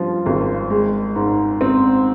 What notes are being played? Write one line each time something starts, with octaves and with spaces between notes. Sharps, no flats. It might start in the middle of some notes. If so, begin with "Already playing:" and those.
Already playing: G2 F3
G#1
G#3
G#2
C4